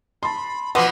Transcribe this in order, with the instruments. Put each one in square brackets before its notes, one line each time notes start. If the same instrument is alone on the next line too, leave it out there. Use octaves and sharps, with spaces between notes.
[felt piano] A5 C6 [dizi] B5
[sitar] B2 F3 [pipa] B3 [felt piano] F#5 C6 [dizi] D6